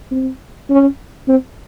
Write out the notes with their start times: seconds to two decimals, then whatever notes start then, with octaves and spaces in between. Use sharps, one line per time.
0.11 C4
0.69 C#4
1.28 C4